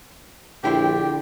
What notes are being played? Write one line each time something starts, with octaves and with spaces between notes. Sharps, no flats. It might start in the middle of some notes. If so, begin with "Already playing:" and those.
A#1 D3 E4 G4 C5 G5